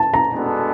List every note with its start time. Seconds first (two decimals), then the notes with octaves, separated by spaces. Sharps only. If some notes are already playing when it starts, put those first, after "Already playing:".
Already playing: A5
0.14 A#5
0.32 G#3 B3 D4 F#4 A4